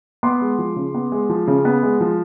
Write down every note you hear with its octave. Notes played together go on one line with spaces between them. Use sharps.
B3 C6 D6
G#3
F3
C#3
B3
G#3
F3
C#3
B3
G#3
F3